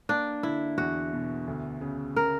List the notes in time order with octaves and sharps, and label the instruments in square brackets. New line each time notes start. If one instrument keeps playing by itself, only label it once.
[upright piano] A#3 [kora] D4
[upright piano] D3 [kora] E4
[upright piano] E2 [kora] F#4
[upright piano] B2
D2
C#3
[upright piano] C#3 [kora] A#4